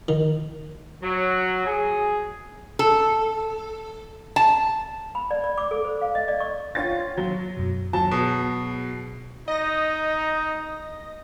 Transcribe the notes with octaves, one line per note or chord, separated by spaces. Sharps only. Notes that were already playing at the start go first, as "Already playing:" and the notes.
D#3
F#3
G#4
A4
A5
B5
D5
D5
D6
A4
C5
F5
D#5
D5
C#6
F4 C#5 F#5 G5 C6 A6
F#3
F#2 B2
F#3 A5
B2 G#4
D#4 D#5 A#6